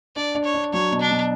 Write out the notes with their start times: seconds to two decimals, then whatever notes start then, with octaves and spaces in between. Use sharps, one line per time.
0.16 D4 D5
0.35 D4
0.44 C#5
0.54 D4
0.73 F#3 C#5
0.91 B2
1.01 D4
1.10 B2